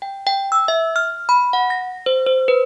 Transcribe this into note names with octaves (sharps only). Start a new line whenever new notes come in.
G5
G5
E6
E5
F6
B5
F#5
A#6
C5
C5
B4